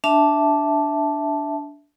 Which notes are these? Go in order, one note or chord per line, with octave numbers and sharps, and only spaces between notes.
D4 E5 A5